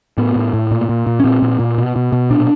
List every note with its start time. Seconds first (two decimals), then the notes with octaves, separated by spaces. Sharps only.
0.18 A2 B3
0.36 A2
0.54 A2
0.71 A#2
0.89 A#2
1.07 A#2
1.20 C#4
1.24 A#2 C4
1.42 A#2
1.60 A#2
1.78 B2
1.96 B2
2.12 B2
2.30 A#2 D4